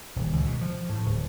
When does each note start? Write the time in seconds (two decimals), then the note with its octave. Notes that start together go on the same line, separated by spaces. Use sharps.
0.16 D#1
0.33 C#2
0.47 B2
0.61 F3
0.90 A2
1.06 D1